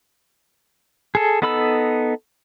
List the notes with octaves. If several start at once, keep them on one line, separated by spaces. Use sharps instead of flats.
G#4 A4
B3 D#4 A4 B5 E6